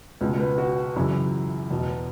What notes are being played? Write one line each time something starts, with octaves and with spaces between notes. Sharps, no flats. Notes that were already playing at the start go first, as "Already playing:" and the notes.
C#2 B2
B4
F#4
F#2 C#3 E3 E4
E2 B2